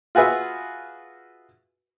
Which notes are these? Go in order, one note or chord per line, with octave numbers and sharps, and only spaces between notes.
F4 F#4 G#4 B4 E5